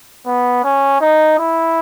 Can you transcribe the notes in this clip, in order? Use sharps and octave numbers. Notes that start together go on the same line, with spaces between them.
B3
C#4
D#4
E4